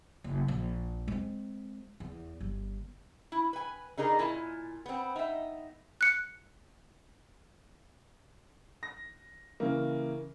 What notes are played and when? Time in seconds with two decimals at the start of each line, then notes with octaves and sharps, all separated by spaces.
0.24 F#1
0.48 A#1
1.08 G#3 C4
2.00 E2
2.40 G1
3.32 E4
3.53 B4 G#5
3.97 D3 D#4 G#4 A#4
4.19 A#2 E4 F4 G#5 A5
4.86 B3 C4
5.16 D#4 E5
6.01 F#6 C#7
8.83 A#6
9.60 C#3 E3 A#3